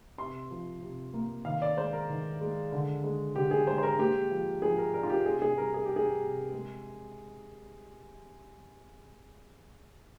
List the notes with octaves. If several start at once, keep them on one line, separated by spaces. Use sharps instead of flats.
C3 C6
F3
C3
A#3
D#3 F5
D5
G#3 C5
A#4
D#3
G#3
D3
G#3
D3 G4
G#4
G#3 C5
C5
A#4
A#3 G4
F3
F3 G#4
A#4
D4 A#4
F4
G4
C3 G#4
G#4
G3 A#4
G#4
G3 G4
G#4
C3
G#3